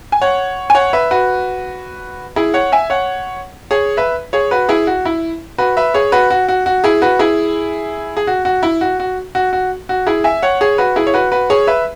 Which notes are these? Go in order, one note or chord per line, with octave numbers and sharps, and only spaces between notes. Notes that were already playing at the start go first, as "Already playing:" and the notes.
G#5
C#5 F#5
G#5
C#5 F#5
B4 E5
F#4 B4
E4 G#4
C#5 F#5
E5 G#5
C#5 F#5
G#4 C#5
B4 E5
G#4 C#5
F#4 B4
E4 G#4
F#4
E4
F#4 B4
B4 E5
G#4 C#5
F#4 B4
F#4
F#4
F#4
E4 G#4
F#4 B4
E4 G#4
G#4
F#4
F#4
E4
F#4
F#4
F#4
F#4
F#4
E4 G#4
E5 G#5
C#5 F#5
G#4 C#5
F#4 B4
E4 G#4
C#5
F#4 B4
F#4 B4
G#4 C#5
B4 E5